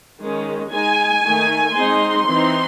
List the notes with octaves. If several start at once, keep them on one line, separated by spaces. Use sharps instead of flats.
D#3 G#3 C#4
G#3 D#4 G#5
D#3 A3 D#4
G#3 C4 D#4 C6
E3 C4 D#4